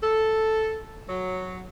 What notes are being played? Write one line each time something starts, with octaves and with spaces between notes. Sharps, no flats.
A4
F#3